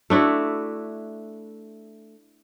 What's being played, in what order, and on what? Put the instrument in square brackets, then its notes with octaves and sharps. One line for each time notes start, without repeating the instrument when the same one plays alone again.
[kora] A3 D4 E4 F#4